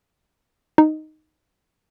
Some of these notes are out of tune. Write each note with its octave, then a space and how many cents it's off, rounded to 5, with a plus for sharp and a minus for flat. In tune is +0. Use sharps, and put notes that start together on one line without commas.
D#4 -5